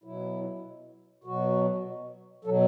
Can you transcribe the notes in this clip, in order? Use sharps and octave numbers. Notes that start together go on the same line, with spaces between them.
B2 F#3 E4
B2 F#3 F#4
B2 F#3 A4